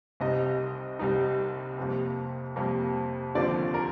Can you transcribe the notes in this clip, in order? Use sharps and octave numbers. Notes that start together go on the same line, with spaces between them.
C2 C3 G3 C4 D#4 D#5
C2 C3 G3 C4 D#4
F2 C3 G3 A#3
F2 C3 G3 A#3
D#2 D3 F3 C4 D5
A#4